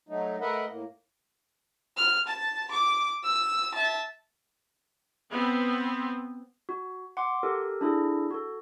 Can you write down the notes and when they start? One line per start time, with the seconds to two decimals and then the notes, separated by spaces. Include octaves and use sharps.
0.09 F#3 A3 D#4
0.41 A3 A#4 B4 D#5 E5 F#5
0.69 A2 A#3
1.97 F6
2.27 A5
2.71 D6
3.24 E6
3.74 E5 A5
5.30 B3 C4
6.69 F#4
7.17 F#5 C6 D6
7.43 G4 A4 A#4
7.81 D4 E4 G#4 A4
8.30 F#4 A4